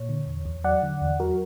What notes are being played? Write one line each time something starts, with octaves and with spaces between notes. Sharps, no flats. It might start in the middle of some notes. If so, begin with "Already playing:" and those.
Already playing: A#2 C#5
D3
E2
E2
F#3 D5 F#5
D3
E2
F#3 F#4 A#4